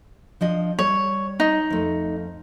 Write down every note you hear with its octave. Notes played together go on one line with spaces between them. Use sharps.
F3 D4 D#5
G3 C#5
D#4
F2 A3